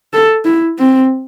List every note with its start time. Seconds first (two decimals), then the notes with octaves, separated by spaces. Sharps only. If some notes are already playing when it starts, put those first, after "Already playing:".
0.13 A4
0.45 E4
0.78 C4